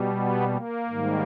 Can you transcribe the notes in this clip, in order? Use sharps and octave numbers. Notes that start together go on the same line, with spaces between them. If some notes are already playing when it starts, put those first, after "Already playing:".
Already playing: B2 G3
B3
A#3
G#2 D#3 G3